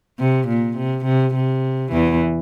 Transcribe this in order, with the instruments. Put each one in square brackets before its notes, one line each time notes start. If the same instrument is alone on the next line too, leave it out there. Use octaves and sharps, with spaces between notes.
[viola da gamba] C3
A#2
C3
C3
C3
E2 E3